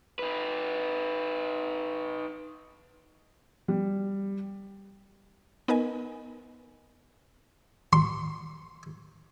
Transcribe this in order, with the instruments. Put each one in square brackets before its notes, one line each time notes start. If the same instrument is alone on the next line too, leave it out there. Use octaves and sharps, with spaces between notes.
[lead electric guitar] D#4 B4
[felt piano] G3
[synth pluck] B3 D#4 A#4 B4 D#5 G#5
[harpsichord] C6